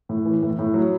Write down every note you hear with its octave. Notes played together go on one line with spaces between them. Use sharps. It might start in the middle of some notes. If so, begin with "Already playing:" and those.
A2
E3
A2
A2
F#3